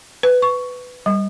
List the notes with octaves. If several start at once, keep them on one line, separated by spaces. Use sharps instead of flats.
B4
C#6
G3